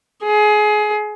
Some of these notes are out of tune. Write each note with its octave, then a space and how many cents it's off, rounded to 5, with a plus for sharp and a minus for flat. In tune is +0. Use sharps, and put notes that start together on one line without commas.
G#4 +25